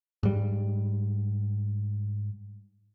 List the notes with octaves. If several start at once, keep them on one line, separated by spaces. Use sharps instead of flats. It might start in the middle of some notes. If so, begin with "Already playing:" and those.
G#2 G3